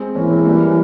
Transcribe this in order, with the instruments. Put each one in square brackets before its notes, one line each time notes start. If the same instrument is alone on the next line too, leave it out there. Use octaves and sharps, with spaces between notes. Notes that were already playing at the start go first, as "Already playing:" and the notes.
Already playing: [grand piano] G#3 C4
[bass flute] E3 [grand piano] A#3 C#4
[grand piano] G#3 C4
G3 A#3